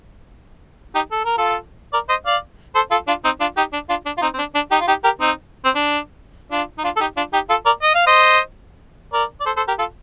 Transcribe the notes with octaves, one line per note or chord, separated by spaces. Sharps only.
D#4 G4
A4
A#4
F4 A4
A#4 D5
C5 D#5
D5 F5
A4 C5
F4 A4
D4 F4
C4 D#4
D4 F4
D#4 G4
D4
D4 F4
D4
F4
C4 D#4
C4
D4
D4
D#4 G4
F4
D#4 G4
G4 A#4
C4 D#4
C4
D4
D4 F4
D#4
D4 F4
A4
D#4 G4
D4 F4
D#4 G4
F4 A4
A#4 D5
D#5
F5
C5 D#5
A#4 D5
D5
A4 C5
A4 C5
G4 A#4
F4 A4